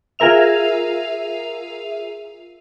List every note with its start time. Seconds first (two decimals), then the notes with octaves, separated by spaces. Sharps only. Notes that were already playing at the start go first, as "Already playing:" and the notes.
0.19 F4 G#4 A#4 E5 F7